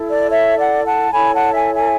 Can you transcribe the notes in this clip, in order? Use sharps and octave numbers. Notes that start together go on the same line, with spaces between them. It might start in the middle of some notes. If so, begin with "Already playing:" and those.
Already playing: E4 A4
D5
C#5 E5
D5 F#5
F#5 A5
E4 A4 C#5 G#5 B5
F#5 A5
E5 G#5
E5 G#5